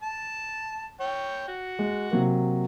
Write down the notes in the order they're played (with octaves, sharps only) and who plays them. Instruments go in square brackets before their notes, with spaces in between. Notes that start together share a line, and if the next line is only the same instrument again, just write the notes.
[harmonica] A5
C#5 G5
F#4
[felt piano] G#3
C3 F#3 A#3